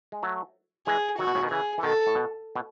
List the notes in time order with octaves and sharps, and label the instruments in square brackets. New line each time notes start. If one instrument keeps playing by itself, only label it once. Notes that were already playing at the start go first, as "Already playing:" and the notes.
[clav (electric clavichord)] G#3
F#3 A3
[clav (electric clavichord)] E3 G#3 [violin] G#4
[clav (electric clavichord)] D#3 F#3 [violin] F#4
[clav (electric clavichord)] B2
A2 C#3
B2 D#3
[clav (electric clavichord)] C#3 E3 [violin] G#4
[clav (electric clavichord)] E3
[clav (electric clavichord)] B2 D#3 [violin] A4
[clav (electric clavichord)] A2
B2
B2